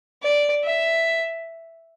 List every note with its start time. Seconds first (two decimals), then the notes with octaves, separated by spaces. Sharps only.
0.23 D5
0.64 E5